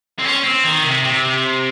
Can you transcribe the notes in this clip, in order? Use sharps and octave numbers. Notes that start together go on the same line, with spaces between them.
C4
C#4
C4
D#3
C3
C3